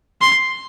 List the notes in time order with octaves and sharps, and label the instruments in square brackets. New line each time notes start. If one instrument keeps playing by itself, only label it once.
[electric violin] C6